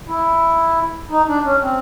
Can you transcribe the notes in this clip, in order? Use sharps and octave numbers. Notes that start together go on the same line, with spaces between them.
E4
D#4
D4
C#4
C4